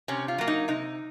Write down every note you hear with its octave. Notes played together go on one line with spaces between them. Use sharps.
C3 C#4
F4
F#3 A#3
D#4
C3 D#4